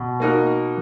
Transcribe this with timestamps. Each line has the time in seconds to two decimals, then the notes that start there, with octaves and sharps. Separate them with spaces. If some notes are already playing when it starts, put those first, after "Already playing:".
Already playing: B2
0.20 A#3 D#4 F#4 A#4